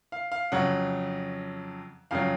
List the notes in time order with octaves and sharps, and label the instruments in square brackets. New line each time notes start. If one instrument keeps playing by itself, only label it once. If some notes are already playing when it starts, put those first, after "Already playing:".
[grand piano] F5
F5
F2 C#3 F#3 F#5
F2 C#3 F#3 F5